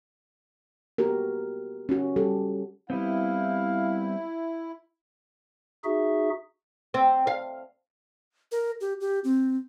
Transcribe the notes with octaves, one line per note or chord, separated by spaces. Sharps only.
B3 F#4 G4 A#4
C#4 F#4
G3 G4 A4
G3 B3 C4 E4 F5
D#4 F#4 G#4 E5
C4
F5
A#4
G4
G4
C4